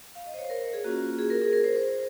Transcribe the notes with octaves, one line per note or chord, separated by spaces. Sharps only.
F5
D#5
C5
C#5
C5
A#4
G#4
A#3 C#4 F4 F#4
G#4
A#4
G#4
A#4
C5
C5